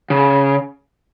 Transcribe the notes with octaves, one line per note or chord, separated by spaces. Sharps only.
C#3